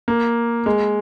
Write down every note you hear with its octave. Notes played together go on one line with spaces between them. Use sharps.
A#3
G#3